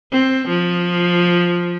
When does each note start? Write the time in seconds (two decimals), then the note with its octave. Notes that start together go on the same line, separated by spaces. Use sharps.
0.12 C4
0.47 F3